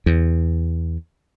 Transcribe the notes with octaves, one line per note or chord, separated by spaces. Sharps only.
E2